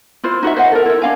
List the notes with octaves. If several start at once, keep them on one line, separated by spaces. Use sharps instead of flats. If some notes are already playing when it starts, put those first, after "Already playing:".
E4 F4 C5
D#4 F#4 A#4 E5
C5 D#5 F#5
A4 A#4
E4 E5
D4 F5 G#5